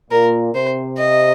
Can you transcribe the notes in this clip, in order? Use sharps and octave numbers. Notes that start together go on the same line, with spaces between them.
A#2 A#4
C3 C5
D#5